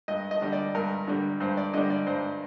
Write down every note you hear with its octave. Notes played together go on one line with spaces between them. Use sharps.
G2 D#5
D#5
D3 G3
D5
G2 A#4
D3 G3
G2 C5
D5
D3 G3 D#5
D5
G2 C5